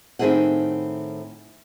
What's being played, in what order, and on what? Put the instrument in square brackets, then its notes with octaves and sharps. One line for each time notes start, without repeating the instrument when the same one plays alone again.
[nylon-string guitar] A2 D#3 C4 E4 G#4 F#5